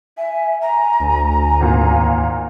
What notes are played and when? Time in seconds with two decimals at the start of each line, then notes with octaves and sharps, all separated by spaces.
0.17 E5 G#5
0.62 A#5
1.00 D2
1.60 G#1 A#2